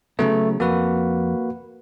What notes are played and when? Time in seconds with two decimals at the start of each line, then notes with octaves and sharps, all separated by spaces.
0.19 C#3 F#3 A3 B3
0.60 F2 A#3 F#4 B4